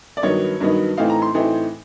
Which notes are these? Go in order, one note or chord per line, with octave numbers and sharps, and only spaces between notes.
D5
G2 D#3 F#3 B3 D#4 C#5
G2 D#3 F#3 B3 D#4
A2 E3 A3 C4 D#4 F5
A#5
C6
A2 E3 A3 C4 D#4